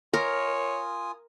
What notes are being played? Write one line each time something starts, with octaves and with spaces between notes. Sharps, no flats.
F4 A#4 C#5 G#5 D#6